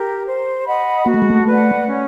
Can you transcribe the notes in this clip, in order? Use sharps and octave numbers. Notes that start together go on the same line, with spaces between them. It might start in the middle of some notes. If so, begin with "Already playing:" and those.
Already playing: G4 A#4
C5
D#5 F#5 B5
A#3 F#4
A3
G#3
A3
B4 D5 F#5
C#4